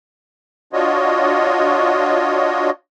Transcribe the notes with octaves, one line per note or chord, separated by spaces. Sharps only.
D4 F4 F#4 C#5 D#5